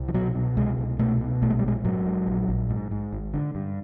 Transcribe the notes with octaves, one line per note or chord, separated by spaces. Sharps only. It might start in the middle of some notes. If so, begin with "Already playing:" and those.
Already playing: C2
F3
B2 F#3
B2
C2 G#3
C2
B2 A3
B2
A#1 A3
G#3
G3
A#1 G#3
G#2 F#3
G#2
A#1
A#1
G#2
G#2
G#1
D3
G2